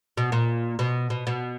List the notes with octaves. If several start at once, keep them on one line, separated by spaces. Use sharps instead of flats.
B2
A#2
B2
B2
B2